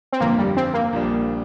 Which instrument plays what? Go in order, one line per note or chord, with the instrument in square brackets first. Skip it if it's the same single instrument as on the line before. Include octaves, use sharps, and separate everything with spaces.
[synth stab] C4
[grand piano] G1 F2 F3 [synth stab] A#3
[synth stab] G3
C4
A#3
[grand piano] A#1 A#2 G3 D4